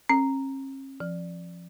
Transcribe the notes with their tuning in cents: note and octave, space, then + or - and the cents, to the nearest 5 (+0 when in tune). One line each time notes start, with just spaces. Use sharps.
C#4 -45
F3 -10